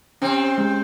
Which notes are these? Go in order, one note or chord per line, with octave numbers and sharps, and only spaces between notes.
C3 C4 C#4
G#3